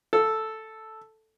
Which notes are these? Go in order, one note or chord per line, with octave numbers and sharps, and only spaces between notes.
A4